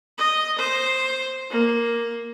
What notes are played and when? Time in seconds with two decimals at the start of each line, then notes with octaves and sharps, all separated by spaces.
0.18 D#5
0.58 C5
1.50 A#3